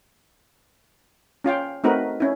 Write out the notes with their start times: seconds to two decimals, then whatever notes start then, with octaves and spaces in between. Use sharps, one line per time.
1.44 C#4 F4 F5 G5
1.84 A3 C4 D#4 F#4 A#4 B4
2.20 C#4 E4